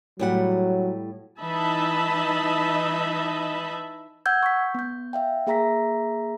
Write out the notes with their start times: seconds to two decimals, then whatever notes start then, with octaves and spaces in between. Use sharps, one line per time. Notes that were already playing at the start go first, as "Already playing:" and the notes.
0.19 A2 F#3 G3 F#5
1.40 E3 D#4 D#5 E5 A5 B5
4.26 F#5 E6 G6 G#6
4.43 C#6 B6
4.75 B3 G6
5.13 E5 F5 G5
5.47 A#3 G#4 E5 A#5 A#6 B6